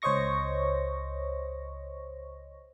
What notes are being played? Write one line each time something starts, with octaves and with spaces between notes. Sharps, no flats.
C#2 C5 C#5 D#5 C#6 A#6